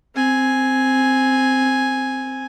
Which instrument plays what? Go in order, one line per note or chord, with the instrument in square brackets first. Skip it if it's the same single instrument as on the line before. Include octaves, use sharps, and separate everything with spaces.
[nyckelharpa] C4 G#5